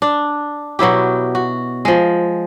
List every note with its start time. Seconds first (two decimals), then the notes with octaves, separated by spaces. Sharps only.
0.02 D4
0.79 B2 F#3 E4 G4
1.35 F#4
1.85 F3 G#3